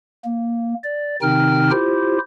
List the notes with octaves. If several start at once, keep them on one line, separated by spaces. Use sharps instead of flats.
A#3
D5
C3 D#3 C4 D#4 G5 F6
E4 F4 G4 C5